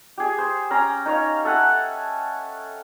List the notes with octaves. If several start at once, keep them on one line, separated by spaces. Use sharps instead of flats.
G4 G#4
C5
C#4 G5 A#5
D#4 C#5 F5
A4 E5 F#5 G#5